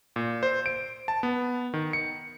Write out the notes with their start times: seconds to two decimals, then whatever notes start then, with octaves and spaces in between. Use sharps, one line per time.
0.16 A#2
0.43 C5
0.66 D7
1.08 A5
1.23 B3
1.74 D#3
1.93 C#7